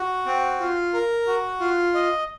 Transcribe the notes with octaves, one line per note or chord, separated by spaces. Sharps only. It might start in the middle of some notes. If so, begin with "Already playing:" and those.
Already playing: F#4
C4
F4
A#4
F#4
F4
D#5